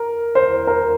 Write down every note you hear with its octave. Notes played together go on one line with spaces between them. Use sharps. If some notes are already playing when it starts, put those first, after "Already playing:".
Already playing: A#4
C5
A#4